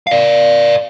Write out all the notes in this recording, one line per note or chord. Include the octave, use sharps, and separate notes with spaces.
D5 F5